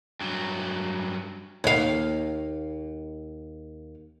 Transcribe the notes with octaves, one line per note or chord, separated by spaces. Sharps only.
G2 F#3
D#2 F5